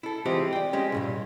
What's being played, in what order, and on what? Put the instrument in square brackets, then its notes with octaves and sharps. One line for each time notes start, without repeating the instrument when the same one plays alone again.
[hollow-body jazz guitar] E4 A4
E3 G#3 C4 F4 G4 C5
D5 G5
G#3 C#4 G4
C2 G2 A#2